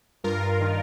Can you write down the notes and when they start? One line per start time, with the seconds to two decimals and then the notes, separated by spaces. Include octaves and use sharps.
0.24 G2 F4 A#4
0.61 D#3